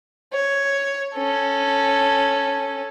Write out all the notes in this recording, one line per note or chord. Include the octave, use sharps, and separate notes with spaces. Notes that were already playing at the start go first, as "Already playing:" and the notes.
C#5
C#4 A4